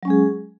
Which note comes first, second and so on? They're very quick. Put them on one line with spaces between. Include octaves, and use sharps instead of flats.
F#3 C#4 G#3 G#4